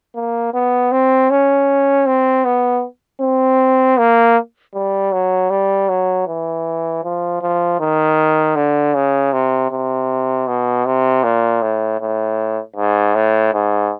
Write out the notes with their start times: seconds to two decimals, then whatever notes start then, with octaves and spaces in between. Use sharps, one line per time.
0.16 A#3
0.54 B3
0.92 C4
1.30 C#4
2.07 C4
2.45 B3
3.21 C4
3.98 A#3
4.74 G3
5.13 F#3
5.51 G3
5.89 F#3
6.27 E3
7.04 F3
7.41 F3
7.80 D#3
8.56 D3
8.95 C#3
9.33 C3
9.71 C3
10.47 B2
10.86 C3
11.24 A#2
11.63 A2
12.01 A2
12.77 G#2
13.15 A2
13.53 G#2